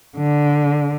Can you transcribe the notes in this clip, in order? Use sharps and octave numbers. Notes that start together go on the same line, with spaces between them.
D3